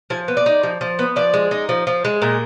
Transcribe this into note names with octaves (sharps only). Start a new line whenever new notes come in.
F3 G#5
B3
D5
D#4
F3
F3
B3
F3 D5
G#3
D#4
F3
F3
G#3
A#2 A#4